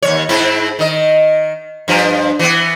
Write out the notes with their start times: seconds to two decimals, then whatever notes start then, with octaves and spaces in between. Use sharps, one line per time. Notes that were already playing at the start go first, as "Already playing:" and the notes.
0.02 D#2 E3 C#5
0.29 G#2 C4 E4
0.79 D#3 D#5
1.88 G2 F3
2.39 E3 B3